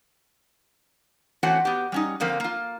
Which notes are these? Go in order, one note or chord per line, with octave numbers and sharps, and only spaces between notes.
E3 A3 C4 C#4 F#4 F#5
B3 G4
G3 C#4 D#4
D3 F3 A#3 C4
A#3 F4